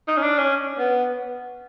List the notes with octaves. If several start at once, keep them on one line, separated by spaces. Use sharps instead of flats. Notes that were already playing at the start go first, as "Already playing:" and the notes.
D#4
C#4
D4
C#4
B3